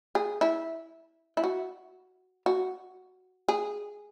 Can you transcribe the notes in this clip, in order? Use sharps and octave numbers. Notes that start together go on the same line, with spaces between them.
G#4
E4
E4
F#4
F#4
G#4